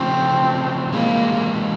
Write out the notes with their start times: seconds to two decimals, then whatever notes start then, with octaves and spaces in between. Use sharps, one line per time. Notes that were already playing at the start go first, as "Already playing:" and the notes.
Already playing: C#3 F3 A3 C4
0.93 C3 E3 G#3 A#3